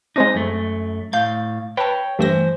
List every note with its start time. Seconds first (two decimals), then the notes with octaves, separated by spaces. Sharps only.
0.16 G#3 C4 D4 D#4
0.35 F#2 A3
1.13 A2 F5 G6
1.77 B4 C#5 G5 A5
2.19 G2 E3 A3 C5 A#6